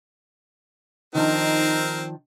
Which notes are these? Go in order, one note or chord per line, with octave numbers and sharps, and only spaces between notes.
D#3 F3 C4 D4 D#4 A#4